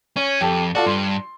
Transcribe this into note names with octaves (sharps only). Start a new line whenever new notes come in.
C#4 C#5
F2 G4 A4
F4 F#4 A4 D5
G2 C6